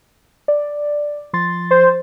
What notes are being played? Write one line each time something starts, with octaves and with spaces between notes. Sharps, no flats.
D5
F3 C6 A6
C5